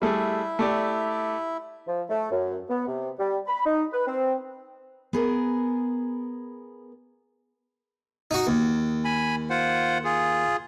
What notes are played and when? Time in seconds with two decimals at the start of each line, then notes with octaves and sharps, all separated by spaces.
0.02 G3 A3 E4 G#4 E5
0.59 A3 G4 D5
1.87 F3
2.09 A3
2.31 F#2
2.70 B3
2.87 C3
3.19 G3
3.47 B5
3.65 D#4
3.92 B4
4.07 C4
5.13 B3 G#4 A#4
8.31 D#4 F#4
8.47 D#2
9.05 G#5 B5
9.50 F4 C5 F#5
10.05 F4 G#4